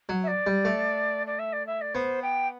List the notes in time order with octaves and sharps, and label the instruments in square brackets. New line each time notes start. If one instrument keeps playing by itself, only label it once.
[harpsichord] F#3
[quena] E5
D5
[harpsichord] G3
A3
[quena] D5
E5
D5
E5
D5
[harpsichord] B3 [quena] C5
[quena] G5